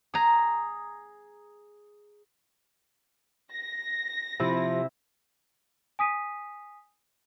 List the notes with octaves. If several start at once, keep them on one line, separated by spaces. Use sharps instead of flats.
G#4 A#5
A#6
C3 F3 E4
G#5 D#6 B6 D#7